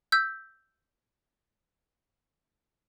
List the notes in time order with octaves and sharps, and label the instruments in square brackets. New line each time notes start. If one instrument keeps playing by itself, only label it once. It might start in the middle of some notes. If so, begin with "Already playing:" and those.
[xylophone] E6 G6 B6